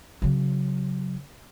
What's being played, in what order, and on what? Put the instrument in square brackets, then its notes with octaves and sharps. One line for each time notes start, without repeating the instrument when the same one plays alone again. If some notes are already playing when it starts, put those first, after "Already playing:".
[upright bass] C#3 F#3